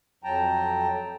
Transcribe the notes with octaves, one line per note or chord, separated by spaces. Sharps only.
F2 F#3 G5 A5 A#5